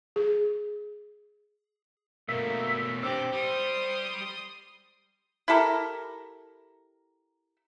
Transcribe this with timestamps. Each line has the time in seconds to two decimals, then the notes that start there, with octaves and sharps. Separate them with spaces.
0.16 G#4
2.29 B2 A3 A#3 E5
3.03 C3 D4 G4 C5 D6 E6
3.33 G3 C6 D#6
5.48 E4 G4 A4 A#4